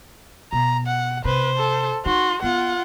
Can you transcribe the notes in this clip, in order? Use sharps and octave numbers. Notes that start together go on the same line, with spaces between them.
B2 A#5
F#5
C3 B4 C5
A4
D#4 F#4 C6
B3 F4 F#5